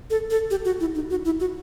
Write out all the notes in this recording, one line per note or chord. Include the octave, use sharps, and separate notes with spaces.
A4
A4
G4
F#4
E4
D#4
F#4
E4
F#4